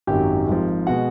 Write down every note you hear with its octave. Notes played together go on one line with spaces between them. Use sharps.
G#1 F#2 D#3 F#3 G4 G5
G#1 G#2 F3
B2 G#3 F#4 F#5